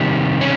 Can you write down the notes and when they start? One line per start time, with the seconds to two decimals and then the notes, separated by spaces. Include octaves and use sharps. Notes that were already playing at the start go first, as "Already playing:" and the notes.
Already playing: C3 D#3 G3
0.41 C#4